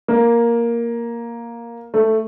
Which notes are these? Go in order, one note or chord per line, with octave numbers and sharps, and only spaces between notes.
A#3
A3